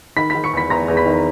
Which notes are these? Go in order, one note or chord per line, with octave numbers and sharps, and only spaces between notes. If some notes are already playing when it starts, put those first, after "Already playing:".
D#3 B5 B6
D#3 B5 B6
C#6 C#7
E2 B5 B6
E2 A#5 A#6
E2
B5 B6
D#3